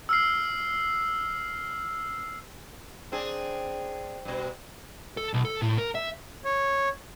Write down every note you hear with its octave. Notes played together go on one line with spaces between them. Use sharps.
E6 F6 C7
C4 D4 G#4
G2 B2
A4
B1
A4
A2
A#4
E5
C#5